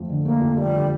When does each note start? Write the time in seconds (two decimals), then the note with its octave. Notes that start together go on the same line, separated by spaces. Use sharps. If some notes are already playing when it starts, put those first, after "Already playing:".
Already playing: F2 F3 A3
0.09 D3
0.25 A3 A#3
0.41 F2
0.58 F3 G3
0.74 D3